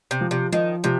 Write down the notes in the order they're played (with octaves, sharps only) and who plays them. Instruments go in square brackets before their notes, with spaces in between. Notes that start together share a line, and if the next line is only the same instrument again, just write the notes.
[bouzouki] C3
[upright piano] F3
[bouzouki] C3
[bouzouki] D#3 [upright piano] F3
[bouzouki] C3 [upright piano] F3